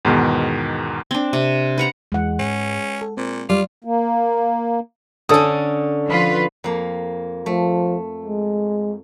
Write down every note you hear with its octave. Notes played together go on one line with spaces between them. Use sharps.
E2 G#2 B2 D#3
C4 D4
C3
B4 F#5 A#5
E2 E3 G#3 F#5
G#2 C#4
A4
A#2 C4
G3 F4 D6
A#3
D3 C#4 A4 D#6
F3 F4 B4
F2 A#3
F3 A3
G#3